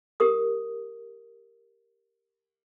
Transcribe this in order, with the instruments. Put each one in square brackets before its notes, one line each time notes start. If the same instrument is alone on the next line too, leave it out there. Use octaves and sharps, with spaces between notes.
[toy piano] G4 A#4 D#6